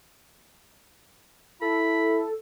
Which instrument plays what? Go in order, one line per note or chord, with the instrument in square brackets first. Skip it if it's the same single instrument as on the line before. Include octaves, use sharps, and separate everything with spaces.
[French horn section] E4 [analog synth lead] A4 [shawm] B5